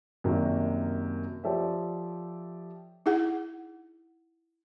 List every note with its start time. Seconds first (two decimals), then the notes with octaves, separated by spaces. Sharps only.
0.24 F#2 C3 D#3 F#3 A#3 D4
1.43 F3 G4 A4 C#5 D5 E5
3.06 D#4 E4 G#4 F#5